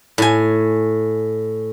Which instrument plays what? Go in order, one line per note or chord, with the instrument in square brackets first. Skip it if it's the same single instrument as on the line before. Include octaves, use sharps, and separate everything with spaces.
[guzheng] A2 G#5